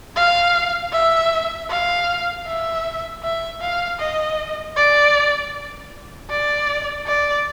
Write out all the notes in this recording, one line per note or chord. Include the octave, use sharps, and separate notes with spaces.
F5
E5
F5
E5
E5
F5
D#5
D5
D5
D5